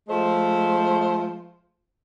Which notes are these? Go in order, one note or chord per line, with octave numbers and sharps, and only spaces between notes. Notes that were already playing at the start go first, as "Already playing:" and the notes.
F3 G#3 A3 C5